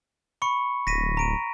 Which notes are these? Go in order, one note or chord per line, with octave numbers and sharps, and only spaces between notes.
B5 C#6 C#7
D1 A#6 B6 D#7
A#5 D7 D#7